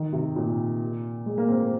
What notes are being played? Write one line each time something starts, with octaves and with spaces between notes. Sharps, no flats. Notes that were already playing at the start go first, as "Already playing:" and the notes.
Already playing: D#3
C3
A#2
G#3
A#3
C4
A#3